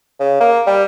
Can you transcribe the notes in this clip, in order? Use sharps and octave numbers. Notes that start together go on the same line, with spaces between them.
C#3
A#3
G3